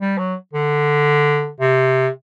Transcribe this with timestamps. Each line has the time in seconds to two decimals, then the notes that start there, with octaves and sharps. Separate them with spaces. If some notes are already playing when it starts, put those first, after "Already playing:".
0.01 G3
0.18 F#3
0.53 D3
1.61 C3